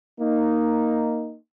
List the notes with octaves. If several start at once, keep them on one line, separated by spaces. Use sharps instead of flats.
A#3 D#4